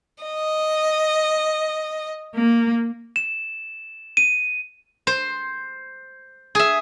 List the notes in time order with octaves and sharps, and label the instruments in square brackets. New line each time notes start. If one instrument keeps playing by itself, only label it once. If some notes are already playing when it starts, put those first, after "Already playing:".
[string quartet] D#5
A#3
[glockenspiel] E7
D#7
[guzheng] C5
G#4 E5